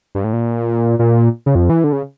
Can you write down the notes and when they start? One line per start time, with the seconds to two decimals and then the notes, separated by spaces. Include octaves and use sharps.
0.15 G2
0.24 A2
0.33 A#2
0.99 A#2
1.46 C#3
1.55 F2
1.70 E3
1.84 D3
1.93 C#3